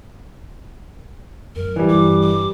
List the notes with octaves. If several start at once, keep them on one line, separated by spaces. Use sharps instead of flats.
F#2 A2 A#4
E3 G3
G2 D6
D6